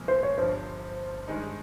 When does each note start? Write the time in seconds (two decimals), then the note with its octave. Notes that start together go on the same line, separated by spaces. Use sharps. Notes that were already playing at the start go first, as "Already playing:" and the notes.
Already playing: C2 A#2 F3 G#3
0.08 C5
0.23 C#5
0.37 G1 G2 F3 C5
1.28 G2 D#3 G#3 D#4